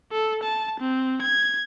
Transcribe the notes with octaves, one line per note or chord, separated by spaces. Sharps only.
A4
A5
C4
G#6